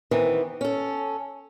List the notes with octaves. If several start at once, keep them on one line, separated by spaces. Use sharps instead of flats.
D#3 E3 B3 C4
C#4 A4